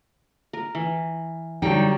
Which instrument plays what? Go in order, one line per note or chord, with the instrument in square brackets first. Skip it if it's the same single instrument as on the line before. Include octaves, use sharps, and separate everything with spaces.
[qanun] A#4
E3
[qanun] D3 F#3 [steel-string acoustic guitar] G3 D#4 G5